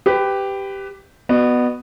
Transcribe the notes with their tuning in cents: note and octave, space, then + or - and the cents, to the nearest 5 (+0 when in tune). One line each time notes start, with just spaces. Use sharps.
G4 +0 B4 +20
B3 +0 F#4 +0 D#5 -45